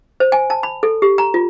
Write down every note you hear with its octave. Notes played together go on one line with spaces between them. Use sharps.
C5
G#5
A5
B5
A4
G4
A#5
F4